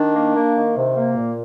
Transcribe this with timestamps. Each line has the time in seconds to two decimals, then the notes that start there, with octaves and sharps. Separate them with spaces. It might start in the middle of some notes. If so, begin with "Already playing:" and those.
Already playing: D#3 D4
0.14 A#3
0.35 A#3
0.55 D#3
0.76 C3
0.96 A#3
1.16 A#2